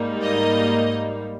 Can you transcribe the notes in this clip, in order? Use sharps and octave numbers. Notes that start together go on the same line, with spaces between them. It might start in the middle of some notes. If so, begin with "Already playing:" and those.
Already playing: G#2 G3 A#3 D#4
D#5